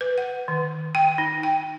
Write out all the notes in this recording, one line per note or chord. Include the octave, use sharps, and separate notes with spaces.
B4
F#5
D#3
G5
D#4
G5